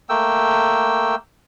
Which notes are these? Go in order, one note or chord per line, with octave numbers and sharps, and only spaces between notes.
A3 A#3 G5 E6